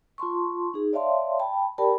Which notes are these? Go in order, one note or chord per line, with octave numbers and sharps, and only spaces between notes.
F4 A5 C6 C#6
D#4 G#4
C#5 D5 E5 F5 A5 C6
G5 A5 B5
G4 A#4 D5 G5 A5 B5